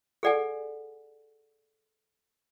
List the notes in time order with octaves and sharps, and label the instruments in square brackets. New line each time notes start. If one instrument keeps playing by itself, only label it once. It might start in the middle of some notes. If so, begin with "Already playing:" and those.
[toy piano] G#4 A4 D5 F#5 G#5